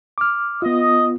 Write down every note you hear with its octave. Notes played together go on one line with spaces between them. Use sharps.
D6 F6
B3 F4 D#5